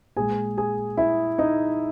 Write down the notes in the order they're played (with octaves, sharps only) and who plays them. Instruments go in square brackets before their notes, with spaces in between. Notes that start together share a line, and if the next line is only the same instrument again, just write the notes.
[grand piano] A#2 G#3 G#4 G#5
G#4 G#5
E4 E5
D#4 D#5